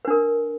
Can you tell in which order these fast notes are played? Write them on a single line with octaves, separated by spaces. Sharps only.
B4 D4 A#4